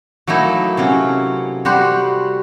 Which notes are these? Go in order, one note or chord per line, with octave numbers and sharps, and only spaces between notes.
F#3 A3 A#3 D#4 E4
C3 F#3 C#4
G3 F#4 G4 C5